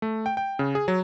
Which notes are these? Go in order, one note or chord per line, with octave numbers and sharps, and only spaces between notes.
A3
G5
G5
C#3
G#4
F#3